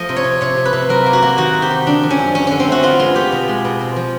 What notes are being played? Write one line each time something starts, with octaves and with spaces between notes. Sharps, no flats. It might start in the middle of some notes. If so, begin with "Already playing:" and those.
Already playing: F3 A3 D#5
C3
C#5
C3
C3 C#5
C3
B4
C3
F#3 A#4
A#3
F#4
A#3
D#3 F#4
C3
G4
D#3
D3 D4
F3
C#4
F#2
F#2 C#4
D3 C#4
C4
A3 F#4
B3 F4
G#3 F4
B3 G4
B2
G#3
B2
C4
F3